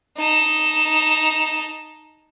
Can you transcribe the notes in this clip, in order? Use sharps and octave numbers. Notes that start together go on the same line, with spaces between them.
D#4 A5